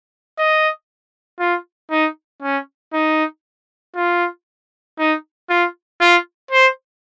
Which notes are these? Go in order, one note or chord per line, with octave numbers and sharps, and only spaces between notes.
D#5
F4
D#4
C#4
D#4
F4
D#4
F4
F4
C5